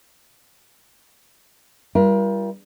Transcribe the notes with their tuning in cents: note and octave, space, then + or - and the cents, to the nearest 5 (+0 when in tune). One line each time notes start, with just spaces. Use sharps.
G3 +0 F4 -45 A#4 +35